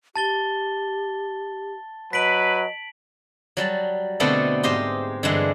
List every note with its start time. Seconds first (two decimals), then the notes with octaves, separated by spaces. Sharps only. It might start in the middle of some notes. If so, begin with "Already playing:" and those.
0.16 G4 A5 A6 G7
2.13 F#3 B4 D#5 B6 D7 F#7
3.57 F#3 G3 A5
4.20 B2 D3 A3 B3 C4 A4
4.63 G#2 G4 C5 D#5 C6
5.23 G2 D3 E3 G#3